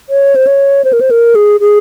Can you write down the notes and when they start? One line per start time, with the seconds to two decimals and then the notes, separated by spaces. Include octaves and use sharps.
0.09 C#5
0.35 C5
0.47 C#5
0.85 C5
0.93 A#4
1.01 C5
1.11 A#4
1.35 G#4
1.60 G#4